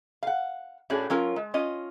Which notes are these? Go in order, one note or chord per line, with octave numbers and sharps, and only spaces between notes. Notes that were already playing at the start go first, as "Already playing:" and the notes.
F5 F#5
A2 A3 C#4 D4 F#4 G#4
F#3 C#4 F4 A#4
G#3
C#4 F4 D#5